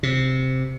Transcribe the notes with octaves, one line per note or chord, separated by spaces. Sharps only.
C3